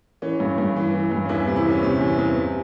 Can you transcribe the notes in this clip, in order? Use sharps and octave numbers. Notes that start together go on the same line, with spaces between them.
E3 C#4
G2
G2
E3
E3
G2
C#4
E2 E3 E4
C3
E3 E4
E2 C#4
C3
E2
E2
C3